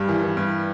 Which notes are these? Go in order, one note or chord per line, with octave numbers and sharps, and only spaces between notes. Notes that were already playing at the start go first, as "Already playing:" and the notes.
Already playing: G2 G3
E3
E3
G2